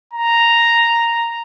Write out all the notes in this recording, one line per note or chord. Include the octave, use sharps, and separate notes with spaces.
A#5